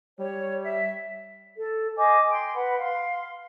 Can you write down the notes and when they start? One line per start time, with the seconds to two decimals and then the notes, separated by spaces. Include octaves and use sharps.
0.19 G3 C#5
0.63 E5
1.55 A4
1.96 C5 D#5 G#5 D6
2.29 G5 C6
2.54 B4 F#5 B5
2.77 F5 C6